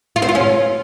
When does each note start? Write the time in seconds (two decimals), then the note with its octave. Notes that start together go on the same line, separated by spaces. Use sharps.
0.16 F4
0.22 C4
0.29 F4
0.35 C#4